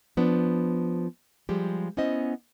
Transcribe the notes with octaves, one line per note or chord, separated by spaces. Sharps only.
F3 B3 D4
F3 G3 G#3 G4
B3 C#4 E4 C5 D#5